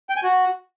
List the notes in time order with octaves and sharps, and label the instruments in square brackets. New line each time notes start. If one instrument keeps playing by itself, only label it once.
[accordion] G5
G#5
F#4